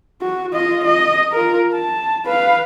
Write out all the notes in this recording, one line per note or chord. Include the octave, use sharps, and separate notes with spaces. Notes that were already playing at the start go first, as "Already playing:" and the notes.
F#4
F4 D#5
D#5
F4 A#4
A5
B4 F5